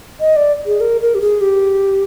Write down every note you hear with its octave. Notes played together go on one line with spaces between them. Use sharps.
D#5
D5
G#4
A#4
A#4
G4
G#4
G4